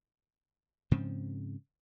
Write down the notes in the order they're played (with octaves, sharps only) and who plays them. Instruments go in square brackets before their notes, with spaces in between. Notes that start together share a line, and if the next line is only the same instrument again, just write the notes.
[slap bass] G#2 C#3 F3 C4